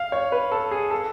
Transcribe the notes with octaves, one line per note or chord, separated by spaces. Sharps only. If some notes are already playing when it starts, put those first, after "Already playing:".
Already playing: F5
C#5
B4
A4
G#4
A4